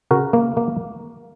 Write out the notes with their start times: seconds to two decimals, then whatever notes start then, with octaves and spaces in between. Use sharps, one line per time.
0.11 C#3 F#4 A#4
0.33 A#3
0.57 A#3